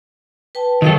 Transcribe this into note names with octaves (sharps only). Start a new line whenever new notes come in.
B4 G5 A5
D#3 F#3 A4 C#5 F5 C#6